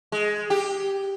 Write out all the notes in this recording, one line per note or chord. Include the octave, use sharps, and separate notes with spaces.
G#3
G4